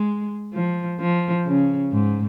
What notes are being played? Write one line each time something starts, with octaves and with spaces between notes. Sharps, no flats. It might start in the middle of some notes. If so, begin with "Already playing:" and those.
Already playing: G#3
F3
F3
C#3
G#2